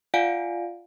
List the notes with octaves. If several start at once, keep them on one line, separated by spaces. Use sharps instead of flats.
F4 D5 F5 F#5 G#5 D7